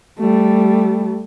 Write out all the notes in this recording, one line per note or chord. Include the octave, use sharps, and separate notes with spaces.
G3 A3